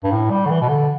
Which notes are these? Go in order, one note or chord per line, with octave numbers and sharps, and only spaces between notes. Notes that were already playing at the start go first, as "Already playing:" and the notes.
G2
A2
G3
D3
E3
B2
D3